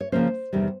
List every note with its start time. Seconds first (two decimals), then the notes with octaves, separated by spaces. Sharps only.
0.01 C#5
0.12 C#3 F3 A#3 C#4 C5
0.53 E2 C3 D#3 G3